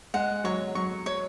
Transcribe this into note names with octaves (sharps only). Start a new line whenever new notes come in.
G#3 F#5
F#3 C#5
F#3 C#6
C#5